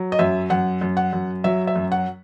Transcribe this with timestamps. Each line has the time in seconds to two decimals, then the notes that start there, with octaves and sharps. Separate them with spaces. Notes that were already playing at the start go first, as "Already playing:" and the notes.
Already playing: F#3
0.12 D#5
0.19 F#2 E5
0.50 F#2 F#5
0.81 F#2
0.97 F#5
1.13 F#2
1.44 F#3 E5
1.67 E5
1.76 F#2
1.92 F#5